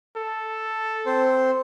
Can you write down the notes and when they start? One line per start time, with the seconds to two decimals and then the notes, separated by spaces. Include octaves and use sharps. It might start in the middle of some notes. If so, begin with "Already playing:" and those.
0.17 A4
1.06 C4 C5